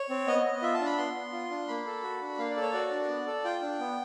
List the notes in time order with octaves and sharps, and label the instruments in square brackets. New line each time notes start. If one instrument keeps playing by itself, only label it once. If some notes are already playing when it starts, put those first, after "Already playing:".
Already playing: [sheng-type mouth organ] C#5
C4
B3 D#5
B3
F4 E5
A5
D4
B5
B3 C6
B3
F4
D4
A#3 B5
A4
F#4
D4
A#3 F5
D5
A4
C#5
F#4 D5
D4
B3
A4
F4 G5
D4
B3